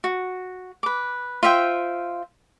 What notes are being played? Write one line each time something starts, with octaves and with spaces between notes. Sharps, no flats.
F#4
B4 D6
F4 C5 E5 G5